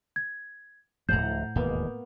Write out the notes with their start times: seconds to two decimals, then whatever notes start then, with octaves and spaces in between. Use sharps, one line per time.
0.16 G#6
1.09 D1 G#1 A2 F3 C5 F#5 A#5 G6
1.56 E1 D#2 G#2 A#3 B3